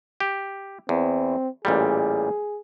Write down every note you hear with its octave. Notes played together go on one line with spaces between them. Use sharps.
G4
E2 C4
A1 A#2 G3 G#4